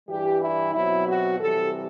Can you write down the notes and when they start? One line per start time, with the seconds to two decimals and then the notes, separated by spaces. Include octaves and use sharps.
0.09 G2 E3 G3 G4
0.41 E4
0.74 B2 F#3 C4 E4
1.07 F#4
1.39 C3 E3 G3 A4